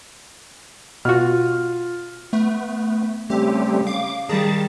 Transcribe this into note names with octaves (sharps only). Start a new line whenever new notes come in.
B2 F4 F#4 F6
A3 B3
C#3 G3 A3 C4 G4
F5 D6
D#3 G3 G#4 A5